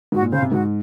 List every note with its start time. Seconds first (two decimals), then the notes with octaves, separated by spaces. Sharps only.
0.12 G#2 F#4
0.22 A#2
0.32 C#3 C5 F5
0.42 C3
0.51 G#2 F#4